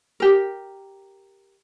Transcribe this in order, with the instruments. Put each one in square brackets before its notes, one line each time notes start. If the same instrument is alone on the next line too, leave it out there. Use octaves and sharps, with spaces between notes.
[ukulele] G4 A#4